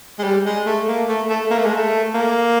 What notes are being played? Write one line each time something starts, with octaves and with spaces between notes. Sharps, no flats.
G#3
G3
G#3
A3
A#3
A3
A3
A#3
A3
G#3
A3
A#3